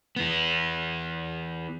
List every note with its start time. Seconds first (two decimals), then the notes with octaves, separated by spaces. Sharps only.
0.16 E3 B3